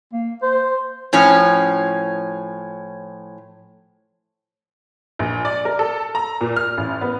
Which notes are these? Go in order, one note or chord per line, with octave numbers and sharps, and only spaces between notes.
A#3
C5
A2 F3 C#4
A#1
D5
A#4
A4
A#5
A#2
F6
A1
B3